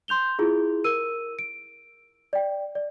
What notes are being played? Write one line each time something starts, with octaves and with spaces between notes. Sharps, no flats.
C6 G6 F7 G7
E4 F4 G#4
A#4 E6 D#7
D7
D5 G5
D5